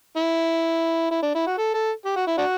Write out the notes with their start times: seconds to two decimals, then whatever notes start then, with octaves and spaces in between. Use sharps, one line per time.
0.17 E4
1.11 E4
1.22 D4
1.35 E4
1.47 F#4
1.58 A4
1.74 A4
2.05 G4
2.16 F#4
2.27 E4
2.38 D4 F#4